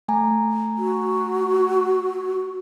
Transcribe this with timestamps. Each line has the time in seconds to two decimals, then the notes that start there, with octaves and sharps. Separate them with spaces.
0.08 A3 G#5 A#5
0.78 F#4